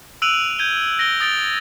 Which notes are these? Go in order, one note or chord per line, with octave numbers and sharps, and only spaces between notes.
E6 F#6 D7 D#7 F7 F#7
G6 G#6 D#7 G7
A#6 D7 G7
D#6 A6 D7 G7